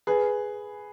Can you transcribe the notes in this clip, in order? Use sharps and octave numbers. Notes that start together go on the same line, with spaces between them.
G#4 B4